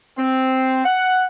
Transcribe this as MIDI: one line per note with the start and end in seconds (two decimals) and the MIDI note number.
0.17 0.84 60
0.84 1.24 78